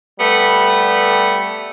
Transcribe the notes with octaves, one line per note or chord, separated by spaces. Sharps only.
G3 A3 B3